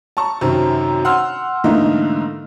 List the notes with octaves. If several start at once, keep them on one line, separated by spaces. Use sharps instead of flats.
A5 A#5 C#6
F#2 C3 D#3 C4 C#4
F#5 C6 E6 F6
G#2 D3 E3 A3 A#3 D#4